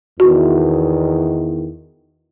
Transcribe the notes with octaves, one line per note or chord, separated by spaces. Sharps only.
E2 D#3 F#4